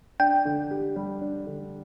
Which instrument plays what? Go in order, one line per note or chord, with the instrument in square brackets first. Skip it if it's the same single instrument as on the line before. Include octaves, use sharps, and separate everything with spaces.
[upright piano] D4 [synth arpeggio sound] G5
[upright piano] D3
G4
G3
D4
D3